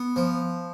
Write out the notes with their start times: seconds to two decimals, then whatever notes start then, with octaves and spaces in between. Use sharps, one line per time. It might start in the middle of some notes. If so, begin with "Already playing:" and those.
Already playing: B3
0.16 F3